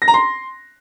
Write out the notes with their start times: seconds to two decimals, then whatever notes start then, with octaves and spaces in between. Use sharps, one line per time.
0.02 A#6
0.08 A#5
0.14 C6